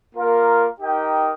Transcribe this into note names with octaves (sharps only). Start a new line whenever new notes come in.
A#3 F4 A#4 F5
D#4 G4 A#4 D#5 G5